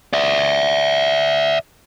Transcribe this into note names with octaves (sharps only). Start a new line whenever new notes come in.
D5 E5